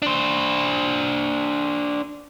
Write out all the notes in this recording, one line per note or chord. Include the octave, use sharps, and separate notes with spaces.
D4 C5